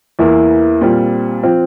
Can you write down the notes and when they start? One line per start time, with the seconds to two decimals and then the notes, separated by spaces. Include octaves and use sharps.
0.19 E2 E3 A#3 E4
0.81 A#2 G3 C4 F4
1.43 F3 C4 F4